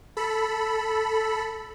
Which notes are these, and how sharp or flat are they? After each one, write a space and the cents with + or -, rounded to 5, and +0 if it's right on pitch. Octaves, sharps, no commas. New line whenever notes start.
A4 +0 B5 +0